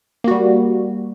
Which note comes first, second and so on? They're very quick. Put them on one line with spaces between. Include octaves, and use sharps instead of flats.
A#3 F#4 G3